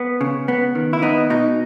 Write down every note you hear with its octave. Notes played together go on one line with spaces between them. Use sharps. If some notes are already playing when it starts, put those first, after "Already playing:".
Already playing: B3
C#3
B3
D#3
E4
B3 D#4
B2 D#4